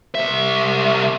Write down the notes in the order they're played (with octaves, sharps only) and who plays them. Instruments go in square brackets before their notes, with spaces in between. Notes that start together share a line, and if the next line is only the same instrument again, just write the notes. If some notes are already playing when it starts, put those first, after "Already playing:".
[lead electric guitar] C2 E5